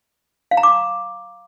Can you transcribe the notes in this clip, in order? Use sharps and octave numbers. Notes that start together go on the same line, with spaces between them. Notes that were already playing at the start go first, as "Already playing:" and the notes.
F5
A#5
D6